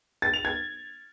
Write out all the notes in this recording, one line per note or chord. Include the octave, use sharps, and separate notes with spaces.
A6
F7
G#6